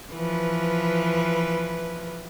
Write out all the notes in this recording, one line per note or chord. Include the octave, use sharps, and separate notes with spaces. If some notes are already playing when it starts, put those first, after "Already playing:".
E3 F3 B4